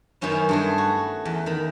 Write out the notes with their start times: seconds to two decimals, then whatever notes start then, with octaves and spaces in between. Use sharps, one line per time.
0.21 F#2 D#3 B3 C#4 E4
0.49 G2 A3 G#4
0.78 F#4
1.25 E2
1.46 D#3 B5